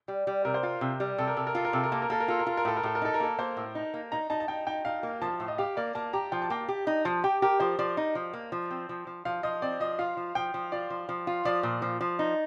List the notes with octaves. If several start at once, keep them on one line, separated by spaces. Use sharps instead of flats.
G3
G3
C3 A#4
C5
F4 A#4
C3
G3
C3 A4
A#4
C3 A4
A#4
F4 A4
A#4
C3 A4
A#4
A#3 A4
A#4
A#3 A4
A#4
F4 A4
A#4
F4 A4
A#4
A2 A4
A#4
A2 A4
A#4
D#4 A4
A#4
A#3 A4
A#3 C5
A2
D#4
A#3
D#4 A#5
D#4 A5
A5
D#4 G5
D#4 G5
D#4 F5
A#3
F3 A5
A2
D#5
G4 F5
A#3 D5
A#3 A5
G4 A#5
F3 G5
A5
A#3 G5
G4
D#4
F3 A5
G4 G5
G4 A#4
F3 C5
F3 D5
D#4
F3
A#3
F3
C4
F3
F3
F3 F5
F3 D#5
C4 D5
F3 D#5
F4 F5
F3
F3 G5
F3
F4 D5
F3
F3
F4
F3 D5
A#2
F3
F3
D#4